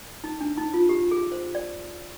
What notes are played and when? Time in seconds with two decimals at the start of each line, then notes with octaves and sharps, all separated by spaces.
0.24 D#4
0.41 D4
0.57 D#4
0.74 F4
0.89 G4
1.11 G#4
1.32 C5
1.55 D5